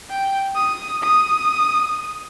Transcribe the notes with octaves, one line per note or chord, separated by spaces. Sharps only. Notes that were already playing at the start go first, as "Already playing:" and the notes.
G5
D#6
D#6